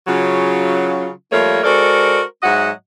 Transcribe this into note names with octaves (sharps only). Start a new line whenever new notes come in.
C#3 F#3 F4
F3 G3 A3 A#3 A#4 C#5
G#3 F#4 A4 A#4 C5 D5
G#2 F#3 F#4 D#5 E5 F#5